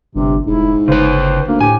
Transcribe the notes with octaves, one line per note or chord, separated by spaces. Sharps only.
G1 G2 C3
E1 G#2 E4
G1 C#3 B4 C5
D2 A#3
A2 G4 G#5